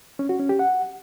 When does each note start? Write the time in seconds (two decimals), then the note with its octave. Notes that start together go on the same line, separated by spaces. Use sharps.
0.19 C#4
0.29 F#4
0.39 C#4
0.49 G4
0.59 F#5